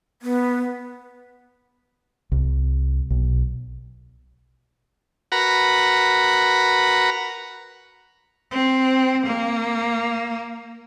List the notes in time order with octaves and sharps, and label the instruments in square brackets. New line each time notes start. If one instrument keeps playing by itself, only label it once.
[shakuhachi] B3
[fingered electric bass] C2
B1
[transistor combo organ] F#4 A#4 B4 F#5 A#5 B5
[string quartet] C4
A#3